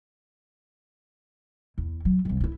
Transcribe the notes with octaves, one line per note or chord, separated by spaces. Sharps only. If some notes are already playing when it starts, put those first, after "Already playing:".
E2
F#3
D#1 C2
E4 F4